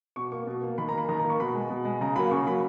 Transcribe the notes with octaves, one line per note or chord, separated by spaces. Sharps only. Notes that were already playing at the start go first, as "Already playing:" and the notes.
B2 C#6
A#3 C#6
B2
A#3
D#3 B5
A#5
A#3 B5
D#3 A#5
A#5
A#3
C#6
B2 B5
G#3
B2
G#3
C#3 A#5
F#3 A#3 B5
C#3 C#6
F#3 A#3 B5